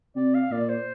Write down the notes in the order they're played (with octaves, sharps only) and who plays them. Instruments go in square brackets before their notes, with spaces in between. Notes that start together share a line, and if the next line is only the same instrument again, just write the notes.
[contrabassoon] C3 [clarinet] D5
[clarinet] F5
[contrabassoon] A#2 [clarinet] D5
[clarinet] C5